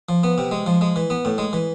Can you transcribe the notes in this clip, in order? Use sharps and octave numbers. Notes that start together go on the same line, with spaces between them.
F3
B3
C3
G#3
F3
G#3
E3
B3
A2
G#3
E3